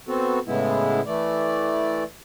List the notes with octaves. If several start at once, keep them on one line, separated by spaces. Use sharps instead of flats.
B3 C4 F#4 A4
A2 C#3 G#3 B3 E4
E3 A3 D5